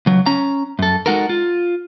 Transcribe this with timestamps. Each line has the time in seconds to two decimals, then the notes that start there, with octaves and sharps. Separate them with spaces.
0.06 C#2 F#3
0.26 C#4 A#5
0.79 F#2 A4
1.06 G#3 D#4 F#4 A4 A#4
1.29 F4